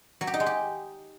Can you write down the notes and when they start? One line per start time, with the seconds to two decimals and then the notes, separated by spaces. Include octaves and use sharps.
0.21 F#3
0.27 G4
0.34 D#4
0.40 G#3
0.46 G4